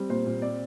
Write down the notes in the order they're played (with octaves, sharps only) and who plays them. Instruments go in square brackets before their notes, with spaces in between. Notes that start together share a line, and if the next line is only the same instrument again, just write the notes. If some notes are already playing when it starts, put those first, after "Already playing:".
Already playing: [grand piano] G3 C4
A#2 C5
A#2
C4 D5